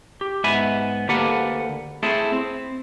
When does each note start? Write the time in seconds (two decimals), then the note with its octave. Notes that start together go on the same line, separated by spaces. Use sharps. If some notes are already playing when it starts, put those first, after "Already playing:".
0.21 G4
0.44 G#2 B3 E5 G#5 B5
1.09 D2 A#3 G4 A4 B4 F#5
2.03 A3 C4 E4 G#4 A4
2.32 C4